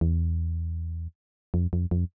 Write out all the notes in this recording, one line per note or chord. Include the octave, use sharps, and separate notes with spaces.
E2
F2
F2
F2